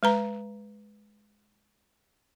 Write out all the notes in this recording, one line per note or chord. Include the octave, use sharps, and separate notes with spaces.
G#3 B4 A#5